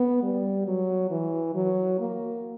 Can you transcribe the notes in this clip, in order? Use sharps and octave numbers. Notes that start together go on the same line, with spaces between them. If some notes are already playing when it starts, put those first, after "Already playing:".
Already playing: B3
G3
F#3
E3
F#3
A#3